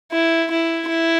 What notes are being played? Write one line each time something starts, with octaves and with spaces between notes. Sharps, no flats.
E4
E4
E4